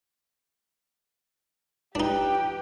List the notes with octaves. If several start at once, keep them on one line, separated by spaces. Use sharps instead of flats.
D4 D#4 G4 B4 G5